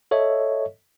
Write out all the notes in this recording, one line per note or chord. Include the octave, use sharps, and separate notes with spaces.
A4 C#5 D#5 E5